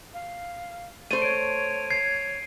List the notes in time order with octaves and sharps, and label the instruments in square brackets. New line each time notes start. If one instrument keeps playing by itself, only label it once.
[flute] F5
[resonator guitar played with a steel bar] A3 C5 [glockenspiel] D#7
[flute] C#5 [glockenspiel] D7
[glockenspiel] G#6 C7